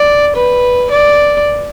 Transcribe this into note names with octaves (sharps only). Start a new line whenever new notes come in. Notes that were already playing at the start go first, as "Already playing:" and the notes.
Already playing: D5
B4
D5